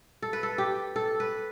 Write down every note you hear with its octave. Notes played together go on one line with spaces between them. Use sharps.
A4
B4
A4
G4
A4
B4